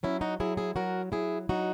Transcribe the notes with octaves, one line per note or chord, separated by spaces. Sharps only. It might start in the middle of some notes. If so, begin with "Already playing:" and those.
F#3 C#4 E4
D#4 F#4
F#3 E4 G#4
E4 G#4
F#3 F#4 A#4
F#3 E4 G#4
F#3 D#4 F#4